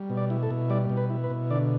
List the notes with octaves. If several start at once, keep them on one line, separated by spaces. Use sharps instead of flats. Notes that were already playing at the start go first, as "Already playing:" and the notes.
Already playing: G3
B2
D5
E4
A4
B2
G3 D5
B2
B4
E4
B4
B2
D3 D5